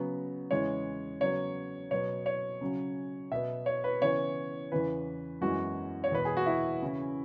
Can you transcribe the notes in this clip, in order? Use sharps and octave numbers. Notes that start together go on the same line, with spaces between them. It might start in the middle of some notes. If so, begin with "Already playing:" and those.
Already playing: C#3 F#3 B3
E2 C#3 E3 G#3 C#5
C#3 F#3 B3 C#5
B2 F#3 B3 C#5
C#5
C#3 F#3 C#4
B2 B3 E5
C#5
B4
C#3 E3 B3 C#5
E2 C#3 E3 B4
F#2 E3 G#3 B3 F#4
C#5
E2 B2 B3 B4
G#4
F#4
E4
C#3 E3 C#4